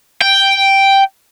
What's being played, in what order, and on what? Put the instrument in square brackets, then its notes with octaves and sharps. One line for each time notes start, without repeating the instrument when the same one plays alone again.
[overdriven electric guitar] G5